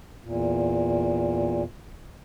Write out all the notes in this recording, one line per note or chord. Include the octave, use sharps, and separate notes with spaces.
E2 A#2